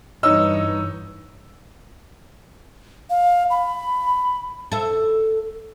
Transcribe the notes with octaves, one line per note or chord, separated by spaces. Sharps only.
G2 E3 D#4 C#5 D#5 E6
F5
B5
A4 E5